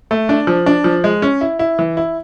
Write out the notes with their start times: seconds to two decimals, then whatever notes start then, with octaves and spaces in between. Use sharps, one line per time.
0.11 A3
0.29 D4
0.47 F3
0.66 D4
0.84 F3
1.04 G#3
1.22 C#4
1.41 E4
1.59 E4
1.79 E3
1.97 E4